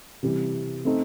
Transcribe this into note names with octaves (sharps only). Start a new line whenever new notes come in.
C3 E3 G3
A3 C4 D#4